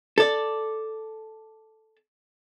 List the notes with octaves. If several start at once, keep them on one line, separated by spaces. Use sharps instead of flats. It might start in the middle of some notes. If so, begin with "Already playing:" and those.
A4 D5